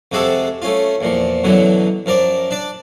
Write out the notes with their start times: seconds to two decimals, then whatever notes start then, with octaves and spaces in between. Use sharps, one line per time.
0.12 F2 C3 G#3 F#4 G4 A4
0.62 A3 C#4 F4
1.01 E2 A#2 F3
1.43 F#2 B2 D3 E3 F#3
2.06 F#2 F3 A#4 D5
2.51 D4 D5